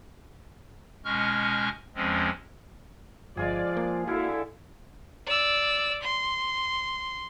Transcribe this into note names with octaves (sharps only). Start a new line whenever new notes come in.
B2 G#3 C#4 C#6 F6 G6
E2 F3 G#3 C4 C#4
G1 F3 G#3 F4 G#4 D5
A#3
D3 E4 F#4 A4 F5 G#5
D5 E6
C6